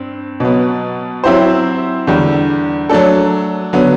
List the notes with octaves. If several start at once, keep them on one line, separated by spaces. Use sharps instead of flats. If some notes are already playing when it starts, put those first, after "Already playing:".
Already playing: G2 C4
B2 F#3 B3
F#3 C4 E4 G4 C5
E2 D3 G3
F#3 A3 D4 A4
D3 F#3 B3